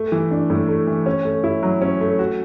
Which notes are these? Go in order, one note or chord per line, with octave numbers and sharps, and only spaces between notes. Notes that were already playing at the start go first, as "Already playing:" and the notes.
Already playing: A3
E3
D4
A2
A3
E3
C#4
A3
E4
F#3
C#4
A3
F#4